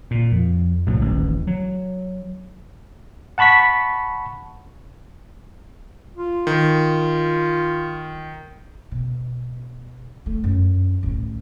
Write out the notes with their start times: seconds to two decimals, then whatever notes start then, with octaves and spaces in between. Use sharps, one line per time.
0.11 A#2
0.32 F2
0.87 C2 A2 F#3
1.01 D1 A1 D#2 E3
1.47 F#3
3.38 F#5 A5 B5 C#6 B6
6.16 F4
6.47 D#3
8.91 B2
10.26 A3
10.44 F#2
11.03 A1 D2